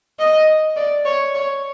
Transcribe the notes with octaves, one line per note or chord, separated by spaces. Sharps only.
D#5
D5
C#5
C#5